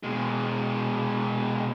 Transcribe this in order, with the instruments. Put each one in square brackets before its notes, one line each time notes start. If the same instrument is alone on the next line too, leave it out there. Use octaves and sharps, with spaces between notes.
[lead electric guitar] B2 G#3